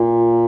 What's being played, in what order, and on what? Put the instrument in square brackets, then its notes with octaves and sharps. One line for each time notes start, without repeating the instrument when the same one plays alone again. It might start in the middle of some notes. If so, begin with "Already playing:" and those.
Already playing: [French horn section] A#2